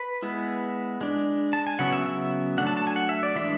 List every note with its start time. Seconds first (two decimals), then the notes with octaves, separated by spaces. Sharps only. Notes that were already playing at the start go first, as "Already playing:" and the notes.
Already playing: B4
0.22 G#3 B3 E4
1.01 G#3 D4
1.53 A5
1.67 G#5
1.79 C#3 F#3 B3 E4 F#5
1.92 E5
2.06 E5
2.58 F#3 A3 D4 F#5
2.67 A5
2.77 A5
2.87 G#5
2.96 F#5
3.09 E5
3.23 D5
3.36 E3 G#3 D4 E5